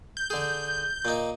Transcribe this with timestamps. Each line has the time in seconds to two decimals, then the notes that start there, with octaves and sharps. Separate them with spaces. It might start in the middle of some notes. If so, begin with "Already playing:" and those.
0.17 G6
0.30 D3 G#4
1.05 A#2 D#4